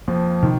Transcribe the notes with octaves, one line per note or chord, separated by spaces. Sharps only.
F2 F3 A#3
B2 D#3